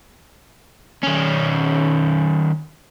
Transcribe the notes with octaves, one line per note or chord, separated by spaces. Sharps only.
D#3 C#4